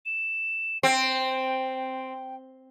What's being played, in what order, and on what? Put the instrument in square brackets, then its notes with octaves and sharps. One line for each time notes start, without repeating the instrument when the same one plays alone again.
[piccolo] E7
[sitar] C4 [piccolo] G5